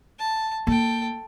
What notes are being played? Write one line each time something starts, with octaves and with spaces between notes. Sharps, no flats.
A5
A#3 A4 G5